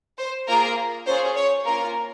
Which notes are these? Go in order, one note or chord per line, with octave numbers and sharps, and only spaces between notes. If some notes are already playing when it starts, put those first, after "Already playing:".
C5
A#3 F4 G#4 A#4
C#4 F4 G#4 C5
C#5
A#3 C#4 F4 A#4